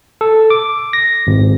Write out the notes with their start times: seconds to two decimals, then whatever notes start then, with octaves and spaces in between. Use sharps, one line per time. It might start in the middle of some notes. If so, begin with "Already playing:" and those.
0.21 A4
0.50 D6
0.93 A#6
1.27 G#1